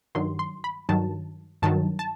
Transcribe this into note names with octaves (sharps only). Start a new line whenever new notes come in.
G2 D#3 F#3 C6
C6
B5
G2 D#3 F#3 A5
G2 D#3 F#3 A5
A5